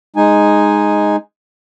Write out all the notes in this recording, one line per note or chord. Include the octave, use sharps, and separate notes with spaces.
G#3 D#4 G#5